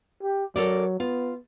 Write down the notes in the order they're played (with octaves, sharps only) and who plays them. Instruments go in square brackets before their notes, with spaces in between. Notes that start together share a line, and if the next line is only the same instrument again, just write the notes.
[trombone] G4
[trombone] F#3 [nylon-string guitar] A4 A#4 D5
[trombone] B3 [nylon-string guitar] F4